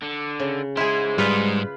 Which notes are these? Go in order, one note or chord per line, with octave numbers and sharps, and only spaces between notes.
D3
C#3
G#3 E4 G#4 C5
G#2 G3 F4 B4